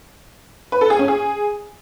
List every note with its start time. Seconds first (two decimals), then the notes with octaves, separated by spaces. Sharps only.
0.72 B4
0.81 A4
0.90 G#4
0.99 C#4
1.08 G#4